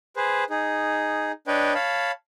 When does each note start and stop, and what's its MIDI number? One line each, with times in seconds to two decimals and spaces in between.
0.16 0.44 68
0.16 0.44 71
0.16 0.44 72
0.50 1.32 63
0.50 1.32 68
1.47 1.74 62
1.47 1.74 71
1.47 1.74 73
1.47 1.74 75
1.47 1.74 79
1.75 2.12 73
1.75 2.12 77
1.75 2.12 81
1.75 2.12 83